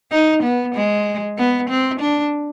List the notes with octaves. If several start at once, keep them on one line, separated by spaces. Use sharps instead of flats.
D#4
B3
G#3
B3
C4
D4